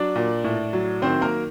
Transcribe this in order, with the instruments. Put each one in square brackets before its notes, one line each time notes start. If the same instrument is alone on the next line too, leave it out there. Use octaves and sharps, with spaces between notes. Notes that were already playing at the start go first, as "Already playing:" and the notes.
Already playing: [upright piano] F#3 D4 D5
A#2
A2
F#3
D#3 C4 C5
A#3 A#4